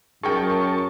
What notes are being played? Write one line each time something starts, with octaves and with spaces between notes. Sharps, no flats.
F#2 G#4 A#4 G5 A5 C#6